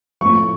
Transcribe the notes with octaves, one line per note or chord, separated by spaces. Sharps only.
A2 F3 C#6